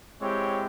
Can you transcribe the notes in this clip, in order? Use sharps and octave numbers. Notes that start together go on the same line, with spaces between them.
G#3 C4 E4 G4 C#5